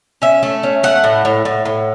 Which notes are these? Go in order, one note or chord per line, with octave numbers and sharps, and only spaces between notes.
C#4 E5
A3
C#4
A3 F#5
A2
A2
A2
A2